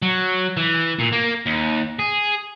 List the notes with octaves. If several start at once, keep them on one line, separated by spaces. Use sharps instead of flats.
F#3
E3
A#2
A#3
D#2
G#4